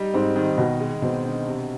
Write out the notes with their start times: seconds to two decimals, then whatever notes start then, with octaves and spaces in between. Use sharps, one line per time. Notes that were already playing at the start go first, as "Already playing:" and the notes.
Already playing: G3 D#4
0.14 G#2 C4
0.36 D#3
0.58 B2 D#4
0.80 G#3
1.02 B2 C4
1.25 D3
1.47 C3